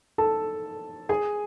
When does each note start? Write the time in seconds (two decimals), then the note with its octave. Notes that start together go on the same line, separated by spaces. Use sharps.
0.18 A4 A5
1.09 G#4 G#5